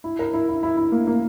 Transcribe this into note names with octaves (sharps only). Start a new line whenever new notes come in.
E4
A#4
E4
E4
E4
E4
A#3
A#3